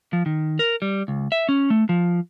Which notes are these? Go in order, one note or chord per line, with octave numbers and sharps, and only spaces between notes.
F3
D#3
A#4
G3
C#2
E5
C#4
A3
F3